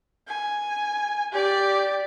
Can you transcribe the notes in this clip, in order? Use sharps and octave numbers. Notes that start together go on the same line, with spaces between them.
G#5
G4 D5